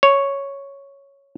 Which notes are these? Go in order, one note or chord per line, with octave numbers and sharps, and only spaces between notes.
C#5